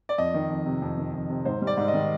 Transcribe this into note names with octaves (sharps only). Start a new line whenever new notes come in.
D5
F2 D#5
D#3
F2
C3
F2
D#3
F2
C3
G#2 C5
G3
D5
G#2
D#5
D#3